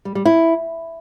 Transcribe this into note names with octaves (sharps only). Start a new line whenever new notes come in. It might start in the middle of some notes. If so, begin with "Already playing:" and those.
G3
G3
E4